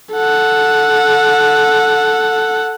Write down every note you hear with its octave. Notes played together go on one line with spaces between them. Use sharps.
A4 F#5